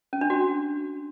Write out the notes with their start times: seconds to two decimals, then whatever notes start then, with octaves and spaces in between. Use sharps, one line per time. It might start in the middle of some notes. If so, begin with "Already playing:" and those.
0.13 C#4
0.21 D4
0.30 F#4